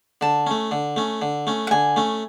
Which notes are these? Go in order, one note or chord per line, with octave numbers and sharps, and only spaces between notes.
D3 A5
A3 C#4
D3
A3 C#4
D3
A3 C#4
F#5
D3 G#5
A3 C#4